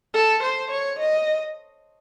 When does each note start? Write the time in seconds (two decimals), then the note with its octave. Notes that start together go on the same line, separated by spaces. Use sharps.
0.14 A4
0.43 C5
0.70 C#5
0.99 D#5